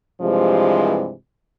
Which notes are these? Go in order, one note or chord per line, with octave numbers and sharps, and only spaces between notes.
G2 C3 E3 F3 G#3